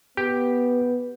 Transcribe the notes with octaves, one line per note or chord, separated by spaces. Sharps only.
B3 G4